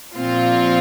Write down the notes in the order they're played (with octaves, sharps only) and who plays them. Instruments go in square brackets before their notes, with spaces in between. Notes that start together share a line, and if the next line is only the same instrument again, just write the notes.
[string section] A#1 A#2 F3 C4 F4